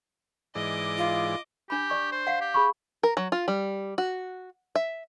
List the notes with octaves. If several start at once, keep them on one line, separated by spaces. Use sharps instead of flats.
G#2 E3 D5 D#5 D6
F4
D4 G4 B5
D5 C#6
C5
F5 F#5
G4
G#4 B5 C#6
A#4
F#3
F4
G3
F#4
E5